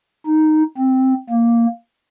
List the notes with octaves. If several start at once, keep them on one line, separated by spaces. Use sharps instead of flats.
D#4
C4
A#3